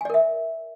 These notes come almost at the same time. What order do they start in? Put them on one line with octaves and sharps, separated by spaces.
G#5 D5 A#4 E5